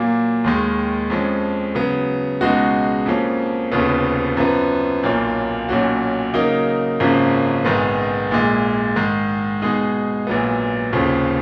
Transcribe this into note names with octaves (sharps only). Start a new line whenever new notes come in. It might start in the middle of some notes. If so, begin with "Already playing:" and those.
Already playing: A#2 F#3 A#3
D#2 D#3 G#3
F2 F3 G#3 C#4
C#3 F#3 B3
C#2 B2 G#3 D#4 F#4
F2 F3 A#3 C#4
F1 D#2 C#3 F3 B3
F#2 F3 B3
B1 A#2 F#3 A#3 F4
B1 A#2 F#3 C#4 F#4
C#3 F#3 A#3 D#4 A#4
G#1 F#2 C#3 F3 A#3
A#1 G#2 D#3 G#3 B3
A#1 A#2 G#3
G#2 D#3 G#3
B2 G#3 D#4 G#4
A#1 A#2 F#3 B3
F1 D#2 C#3 F3